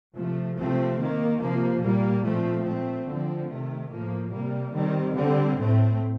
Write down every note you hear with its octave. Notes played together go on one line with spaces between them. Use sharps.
C3 F3 A3
C3 F3 A3 C4
D#3 A#3
C3 F3 A#3
A#2 G3 A#3
A#2 F3 A3 C4
A#2 A3 C4
D3 F3 C4
C3 D#3 A3
A2 F3 A#3
C3 G3 A#3
D#3 G3 C4
D3 G3 C4
A2 A3 C4